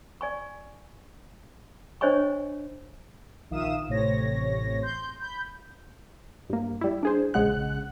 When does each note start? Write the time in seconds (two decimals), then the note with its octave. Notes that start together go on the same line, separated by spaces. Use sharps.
0.21 D5 G#5 C#6
2.01 D4 C5 C#5 D#5 G#5 C#6
3.50 A#1 D#3 E5 F5 D#6 E7
3.88 A1 A2 C3 C#5 A#6
4.82 C6 G6
5.20 B5 G6
6.49 G2 A#3
6.81 G3 E4
7.03 D4 G#4 C5
7.34 A#1 C#3 G#3 F#5 F#6